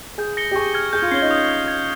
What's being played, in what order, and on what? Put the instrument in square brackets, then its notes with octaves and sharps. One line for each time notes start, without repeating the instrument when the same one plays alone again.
[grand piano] G#4 [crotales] G6
[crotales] A#6 C#7 G7
[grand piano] G4
[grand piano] G#4 [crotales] C#6
[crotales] F6 G#6
[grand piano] G#4 [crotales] G6
[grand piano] F4
[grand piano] C#4 [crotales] C7 G7
[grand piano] D#4
[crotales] D#6
G#6 C7
G#6